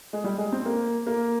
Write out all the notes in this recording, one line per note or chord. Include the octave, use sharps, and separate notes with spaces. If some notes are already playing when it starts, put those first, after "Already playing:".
G#3
G3
G#3
C4
A#3
A#3